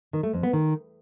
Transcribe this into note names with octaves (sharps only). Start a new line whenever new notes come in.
D#3
A3
F2
B3
D#3